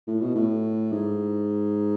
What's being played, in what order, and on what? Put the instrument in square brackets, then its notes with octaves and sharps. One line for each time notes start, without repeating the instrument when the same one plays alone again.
[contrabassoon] A2
B2
A2
G#2